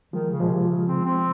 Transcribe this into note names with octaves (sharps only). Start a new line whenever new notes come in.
D#3 F3 G#3
C#3
A#2 F3 G#3
C3
C#3
C4
C4